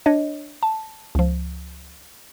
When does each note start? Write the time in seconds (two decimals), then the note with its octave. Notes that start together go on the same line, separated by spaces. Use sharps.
0.06 D4 C#5 D#5
0.63 A5
1.15 C#2 F3